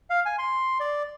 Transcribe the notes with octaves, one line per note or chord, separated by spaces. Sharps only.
F5
G#5
C6
D5